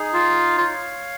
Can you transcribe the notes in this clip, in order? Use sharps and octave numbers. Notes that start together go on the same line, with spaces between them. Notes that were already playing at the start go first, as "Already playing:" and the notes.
Already playing: D#4 G#4
F4 F5
F4 C#5